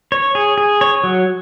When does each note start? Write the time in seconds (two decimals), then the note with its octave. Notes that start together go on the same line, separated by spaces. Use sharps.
0.12 C#5
0.35 G#4
0.58 G#4
0.81 C#5
1.04 F#3